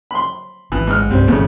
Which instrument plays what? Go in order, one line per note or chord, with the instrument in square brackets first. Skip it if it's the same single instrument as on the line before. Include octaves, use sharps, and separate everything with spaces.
[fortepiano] B5 C6
[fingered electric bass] G#1 [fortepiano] E3
[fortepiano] G#2 F6
[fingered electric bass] C2 G2 [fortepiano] G3 C4
[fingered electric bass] G1 E3 [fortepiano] A2 C#3 A3